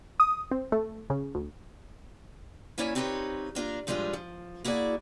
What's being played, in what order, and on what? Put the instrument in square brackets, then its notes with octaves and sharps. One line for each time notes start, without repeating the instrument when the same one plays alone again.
[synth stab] D#6
C4
A3
C#3
D2
[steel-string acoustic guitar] A#3 C#4 E4 C#5 D5 G#5
C4 D#4 F4 G4 B4 C#5
A#3 D4 F4 A#4
A2 F3 G3 G#3 D4 F4
F3
A#3 E4 F#4 G#4 D5